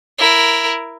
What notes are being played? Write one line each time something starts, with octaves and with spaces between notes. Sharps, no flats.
E4 A#4